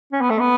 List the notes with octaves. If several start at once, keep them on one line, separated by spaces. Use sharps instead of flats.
C#4
B3
A3
B3